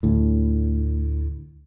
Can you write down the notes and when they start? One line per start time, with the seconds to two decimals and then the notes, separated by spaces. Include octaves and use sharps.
0.03 D2 A2